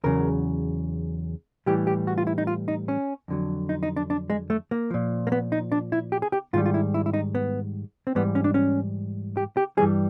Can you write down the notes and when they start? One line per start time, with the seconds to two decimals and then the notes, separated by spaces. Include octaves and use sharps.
0.04 E2 C#3 F#3 A#4
1.66 A2 E3 G3 G4
1.87 G4
2.07 F#4
2.18 F4
2.27 E4
2.38 D#4
2.47 F4
2.68 D#4
2.88 C#4
3.28 F2 D3 F#3
3.69 D#4
3.83 D#4
3.96 D4
4.10 D4
4.30 G#3
4.50 A3
4.71 A#3
4.90 A#2 F3
5.27 A#3
5.32 B3
5.52 D#4
5.72 D4
5.92 E4
6.12 G4
6.22 G#4
6.32 G4
6.53 G#2 D#3 G3 F4
6.66 F4
6.74 E4
6.94 E4
7.06 E4
7.13 D#4
7.35 B3
8.07 C4
8.15 G#2 E3 G3 B3
8.35 C#4
8.44 D4
8.54 C#4
9.37 G4
9.57 G4
9.77 G2 E3 G3 G#4